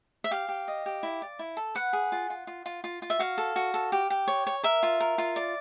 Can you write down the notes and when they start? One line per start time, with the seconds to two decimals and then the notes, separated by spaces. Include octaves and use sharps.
0.24 E5
0.31 G4 F5
0.48 G4
0.68 D#5
0.86 G4
1.03 E4
1.22 D5
1.39 E4
1.57 A4
1.75 B4 F#5
1.93 G#4
2.12 F4
2.30 F4
2.47 F4
2.66 F4
2.84 F4
3.02 F4
3.10 E5
3.19 F#4 F5
3.38 A4
3.56 F#4
3.74 A4
3.92 G4
4.10 G4
4.28 C#5
4.47 C#5
4.63 A#4 E5
4.83 F4
5.00 A#4
5.18 F4
5.36 D5